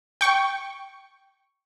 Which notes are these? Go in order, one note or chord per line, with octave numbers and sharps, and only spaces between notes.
G5 C#6